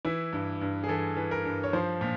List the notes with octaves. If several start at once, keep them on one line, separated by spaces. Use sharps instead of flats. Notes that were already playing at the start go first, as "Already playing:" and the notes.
E3 E4
G2
G2
G#4
E3 A4
E3
A#4
G2
C#5
F3 C5
A#2